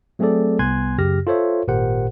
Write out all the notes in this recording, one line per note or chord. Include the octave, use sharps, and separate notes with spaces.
F#3 A3 C4 G#4 A4 D5
C2 B3 G#5 C6 F#6 G#6
F#2 C#3 G4 F6 A#6
F4 A4 C5 C#5 E5
G#1 A#2 G4 A#4 C5 F#5